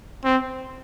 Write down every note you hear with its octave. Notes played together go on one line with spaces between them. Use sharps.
C4